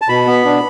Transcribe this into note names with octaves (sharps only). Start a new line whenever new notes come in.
A5
B2 B5
B3
D4